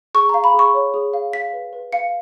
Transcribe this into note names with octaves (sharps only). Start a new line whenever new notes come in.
G#4 C#6
F5 A#5
B5
G#4 C#6
C#5
G#4
F5
F5 B6
B4
B4
F5 C#7